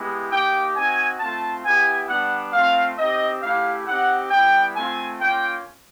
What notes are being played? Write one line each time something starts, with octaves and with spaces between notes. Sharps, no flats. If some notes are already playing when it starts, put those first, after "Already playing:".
Already playing: G#3 B3 E4 G4
A#3 D#4 G4 G5
C4 D#4 F#4 G#5
A3 C4 F4 A5
B3 E4 G4 G#5
G3 B3 D4 F#5
A3 C4 F4 F5
C4 D#4 G4 D#5
A3 C#4 E4 G4 F5
C4 D#4 G4 F#5
G3 B3 E4 G5
A3 C4 F4 G#5
A#3 C#4 F4 G5